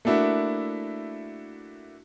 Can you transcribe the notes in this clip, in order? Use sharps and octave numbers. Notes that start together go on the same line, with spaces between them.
A3 A#3 D4 E4 F#4